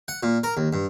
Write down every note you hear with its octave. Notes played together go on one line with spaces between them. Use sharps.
F#5
A#2
A#4
D#2
G2